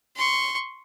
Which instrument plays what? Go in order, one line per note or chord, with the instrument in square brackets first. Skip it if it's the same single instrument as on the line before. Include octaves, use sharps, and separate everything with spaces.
[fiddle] C6 C#6